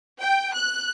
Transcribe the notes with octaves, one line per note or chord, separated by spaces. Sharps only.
G5
F#6